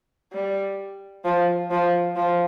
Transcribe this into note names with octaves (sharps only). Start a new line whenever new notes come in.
G3
F3
F3
F3